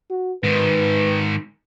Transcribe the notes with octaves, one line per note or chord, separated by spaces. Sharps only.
F#4
G#2 D#3 B4